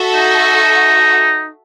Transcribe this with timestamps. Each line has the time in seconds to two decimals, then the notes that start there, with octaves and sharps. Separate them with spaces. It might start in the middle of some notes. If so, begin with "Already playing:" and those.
Already playing: F#4 A4 E5
0.16 D#4